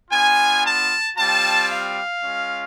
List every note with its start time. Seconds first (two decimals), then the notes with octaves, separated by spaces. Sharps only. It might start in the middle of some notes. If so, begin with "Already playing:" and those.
0.11 B3 D4 F4 G#5
0.64 A5
1.17 G3 C4 F4 A5
1.69 F5
2.22 G#3 C#4 F4